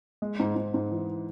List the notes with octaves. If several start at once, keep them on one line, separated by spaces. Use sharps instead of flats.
G#3
G#2
G#2
G#2
E3